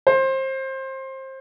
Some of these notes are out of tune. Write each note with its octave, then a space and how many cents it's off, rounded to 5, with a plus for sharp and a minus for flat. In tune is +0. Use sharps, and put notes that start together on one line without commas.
C5 +25